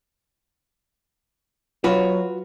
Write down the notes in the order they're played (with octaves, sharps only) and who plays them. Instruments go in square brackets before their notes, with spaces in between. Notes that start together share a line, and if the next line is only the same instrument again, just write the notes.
[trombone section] F#3 [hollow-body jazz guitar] F4 F#4 B4